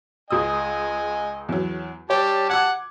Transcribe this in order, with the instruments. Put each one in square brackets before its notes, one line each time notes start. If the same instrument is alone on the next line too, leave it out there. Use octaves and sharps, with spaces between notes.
[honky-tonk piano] C#2 D#6 [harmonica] D#5 G#5
[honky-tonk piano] E2 F#3
[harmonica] G3 A5 [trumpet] G4 [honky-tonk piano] C#5
[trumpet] F#5 [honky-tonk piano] D6 G#6